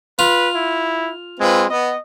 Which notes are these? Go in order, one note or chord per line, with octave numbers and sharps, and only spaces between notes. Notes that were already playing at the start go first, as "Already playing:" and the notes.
F4 B4
E4
G#3 C4 F4 B4
B3 D#5